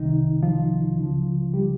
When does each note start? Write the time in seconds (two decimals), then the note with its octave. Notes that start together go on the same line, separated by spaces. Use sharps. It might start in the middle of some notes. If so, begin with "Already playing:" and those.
Already playing: C2 C3 D#3 D#4
0.43 F3 F4
0.98 C#2 C#3 F3
1.53 G3 G4